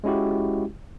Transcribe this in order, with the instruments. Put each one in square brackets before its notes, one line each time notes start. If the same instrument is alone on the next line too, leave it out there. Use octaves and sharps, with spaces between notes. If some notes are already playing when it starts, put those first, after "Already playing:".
[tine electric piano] G#3 C#4 E4 F#4 G4